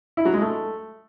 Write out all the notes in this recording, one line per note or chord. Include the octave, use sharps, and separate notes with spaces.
E4
F#3
G#3
A3